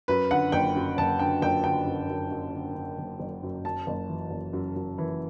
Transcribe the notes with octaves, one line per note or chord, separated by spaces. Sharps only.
F#2 B4
D3 F#5
F#1 G5
F#2
F#1 A5
D3 G5
F#1 G5
D3 G5
F#2
F#2
F#2
D3
D3
F#1
F#1
F#2
F#2 A5
F#1
E3
F#1
F#2
F#2
E3